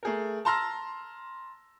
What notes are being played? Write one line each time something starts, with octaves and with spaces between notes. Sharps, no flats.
A3 G#4 A#4
A5 A#5 C6 E6 F6 A#6